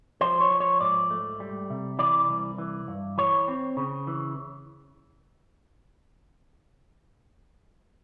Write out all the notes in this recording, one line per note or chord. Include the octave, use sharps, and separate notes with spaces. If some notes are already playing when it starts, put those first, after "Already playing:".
F3 C5
C#5
F3
C#5
G#2 D5
A3
G3
C3
E3 D5
C2
E3
G2
E3 C#5
C4
C#3
E3